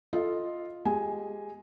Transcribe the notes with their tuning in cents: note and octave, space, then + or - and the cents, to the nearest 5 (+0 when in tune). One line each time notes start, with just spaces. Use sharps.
F4 +0 A4 +0 D#5 +0
G#3 +0 G4 +0 G#5 +0